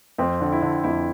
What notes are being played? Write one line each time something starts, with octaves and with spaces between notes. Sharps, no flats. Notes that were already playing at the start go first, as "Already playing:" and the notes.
F2 C4
D3
E4
D3
F2 E4